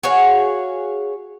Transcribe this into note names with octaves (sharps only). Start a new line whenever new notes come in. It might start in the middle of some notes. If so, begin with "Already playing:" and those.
F#4 G#4 C#5 F5